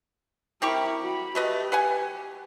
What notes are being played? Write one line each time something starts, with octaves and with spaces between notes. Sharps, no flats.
C4 E4 G4 A#4 C#6
F#4 B5
A3 G4 B4 D#5
B4 F#5 G#5